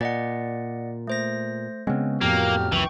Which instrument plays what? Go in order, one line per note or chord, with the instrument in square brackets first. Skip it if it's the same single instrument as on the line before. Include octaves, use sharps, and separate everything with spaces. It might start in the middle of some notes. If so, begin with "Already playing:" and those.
[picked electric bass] A#2 [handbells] D5 D#5 F#5
[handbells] A3 C5 A#6
[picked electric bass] C#3 G#3 [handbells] B3 C4
[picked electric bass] F2 A2 F3 [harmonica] F#3 G4 F6 [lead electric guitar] A#3
[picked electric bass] C#2 F#2 [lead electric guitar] E3 [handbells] G5 C#6